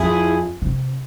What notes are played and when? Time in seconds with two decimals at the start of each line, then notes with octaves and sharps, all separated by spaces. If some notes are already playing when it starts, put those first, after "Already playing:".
Already playing: F2 E4 G#4
0.62 C3